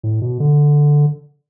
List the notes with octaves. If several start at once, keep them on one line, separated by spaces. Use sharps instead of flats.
A2
B2
D3